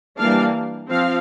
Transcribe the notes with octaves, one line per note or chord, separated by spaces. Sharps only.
E3 G3 A#3 D4 F5
F3 C4 F5